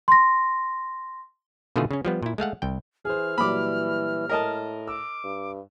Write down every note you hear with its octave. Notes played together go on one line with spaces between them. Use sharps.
C6 A#6
B2 D3 D#3 A3 F4 G#4
C#3 C#4
F3 G3 B3
A#2 E4
G#3 A3 F5 F#5
C2 G5
E3 G#4 C5 F6
A#2 E3 F#3 G3 B5 D6
A2 A#4 D#5 A5
D6 E6
G2